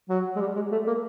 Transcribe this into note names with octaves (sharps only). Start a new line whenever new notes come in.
F#3
G#3
G3
G#3
A3
A#3